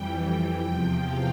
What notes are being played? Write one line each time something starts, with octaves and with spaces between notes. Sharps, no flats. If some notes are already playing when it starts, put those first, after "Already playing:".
Already playing: F2 E3 G3 G5
E2 C3 F3 G5
F5